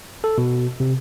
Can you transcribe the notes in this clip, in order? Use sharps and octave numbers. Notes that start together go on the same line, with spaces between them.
A4
B2
C3